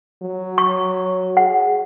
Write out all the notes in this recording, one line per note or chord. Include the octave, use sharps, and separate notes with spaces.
F#3
C#6
G#4 F#5